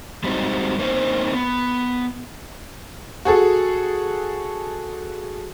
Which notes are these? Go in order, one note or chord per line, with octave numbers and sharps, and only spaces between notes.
G3 G#3 C4 D#4 F#4
A#3 C4 C#4 D#4 F#4 C5
B3
F#4 G#4 A4